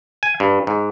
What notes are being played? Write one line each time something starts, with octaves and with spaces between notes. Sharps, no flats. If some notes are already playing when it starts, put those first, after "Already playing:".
G#5
G2
G#2